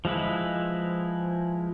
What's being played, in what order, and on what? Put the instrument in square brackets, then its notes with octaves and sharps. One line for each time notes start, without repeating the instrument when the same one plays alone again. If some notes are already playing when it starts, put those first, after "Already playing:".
[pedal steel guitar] F3 G#3 E4 B4